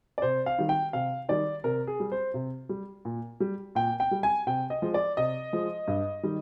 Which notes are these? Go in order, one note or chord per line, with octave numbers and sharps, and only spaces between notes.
D5
C3 C5
F5
D#3 G3
G5
C3 F5
D#3 G3 D5
C3 A#4
G#4
G3
C5
C3
G3
A#2
G3
A#2 G5
G5
G3
G#5
C3 G5
D#5
F3 G#3
D5
C3 D#5
F3 G#3
G2
D#3 G3